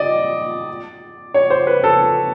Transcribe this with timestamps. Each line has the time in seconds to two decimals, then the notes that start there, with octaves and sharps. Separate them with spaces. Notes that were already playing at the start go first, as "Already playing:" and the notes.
Already playing: D5 D#5
1.34 C#5
1.50 C5
1.67 B4
1.84 A4